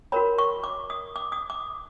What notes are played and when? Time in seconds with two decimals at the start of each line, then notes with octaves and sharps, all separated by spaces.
0.12 F#4 A#4 C#5 B5
0.38 C#6
0.64 D6
0.90 D#6
1.16 D6
1.32 D#6
1.50 D6